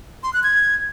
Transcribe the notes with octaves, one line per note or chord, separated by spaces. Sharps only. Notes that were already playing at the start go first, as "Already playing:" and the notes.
C6
F#6
G#6